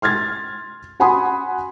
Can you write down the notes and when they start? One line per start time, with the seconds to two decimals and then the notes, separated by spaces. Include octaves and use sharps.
0.02 C6 F6 G#6 A6
1.00 F#4 F#5 G#5 B5 C6 D#6